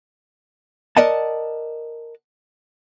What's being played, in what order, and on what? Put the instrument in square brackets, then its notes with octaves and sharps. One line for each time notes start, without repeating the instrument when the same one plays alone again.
[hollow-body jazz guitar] A#4 D5 D#5 F#5 A5